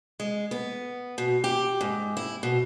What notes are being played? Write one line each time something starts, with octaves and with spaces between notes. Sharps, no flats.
G#3
B3
B2
G4
G#2
E4
B2